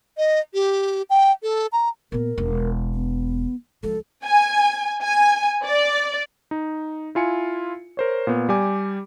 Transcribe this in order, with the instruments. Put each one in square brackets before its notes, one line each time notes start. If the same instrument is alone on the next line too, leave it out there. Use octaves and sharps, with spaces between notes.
[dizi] D#5
G4
G5
A4
A#5
[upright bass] A#2 B3 [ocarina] A#4
[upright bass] E1
[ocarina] B3
[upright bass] C#2 F3 [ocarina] A4
[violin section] G#5
G#5
D5
[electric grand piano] D#4
E4 F4 G#5 C#7
A#4 C5 C#5
A#2 B3
G3 G4 D5 G#5 D6